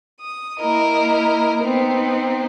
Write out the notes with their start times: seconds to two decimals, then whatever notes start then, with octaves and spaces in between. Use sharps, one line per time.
0.21 D#6
0.59 A#3 E4 A#4 D#5
1.61 B3 C4 D#4